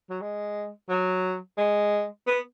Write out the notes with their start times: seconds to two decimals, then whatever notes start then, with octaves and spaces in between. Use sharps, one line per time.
0.10 F#3
0.21 G#3
0.89 F#3
1.58 G#3
2.27 B3